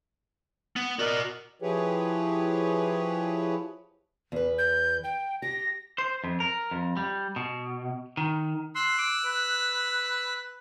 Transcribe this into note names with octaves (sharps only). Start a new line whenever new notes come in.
B3
F#4 A#4 D5 D#5
F3 E4 G4 G#4 B4 C#5
E2 B4
G6
G5
G4 A#6
C5
F2
A#4
F2
G3
B2
D#3
C6 E6 F#6
D6
B4